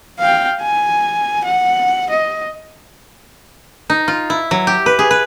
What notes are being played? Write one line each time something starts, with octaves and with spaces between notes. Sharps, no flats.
F5 G5
G#5
F#5
D#5
D#4
F4
E4
F#3
G4
B4
G#4
B4